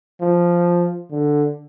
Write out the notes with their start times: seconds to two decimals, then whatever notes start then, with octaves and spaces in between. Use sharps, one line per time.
0.21 F3
1.11 D3